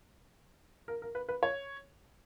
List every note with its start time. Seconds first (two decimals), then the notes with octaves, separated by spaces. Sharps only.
0.88 A#4
1.02 A#4
1.15 B4
1.29 B4
1.43 C#5